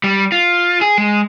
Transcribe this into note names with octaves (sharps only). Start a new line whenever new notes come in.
G3
F4
G#4
G#3